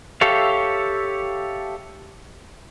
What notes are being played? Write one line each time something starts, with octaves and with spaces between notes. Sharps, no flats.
G4 A4 C#5 E5 F5